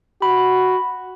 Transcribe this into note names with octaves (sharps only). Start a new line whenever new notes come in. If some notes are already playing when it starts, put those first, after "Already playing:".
F#4 B5